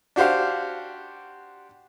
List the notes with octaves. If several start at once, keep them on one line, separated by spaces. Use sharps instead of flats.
D4 F#4 G4 C5 F5